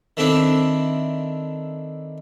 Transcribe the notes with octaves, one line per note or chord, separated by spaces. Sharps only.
D#3 A3 C4 D4 E4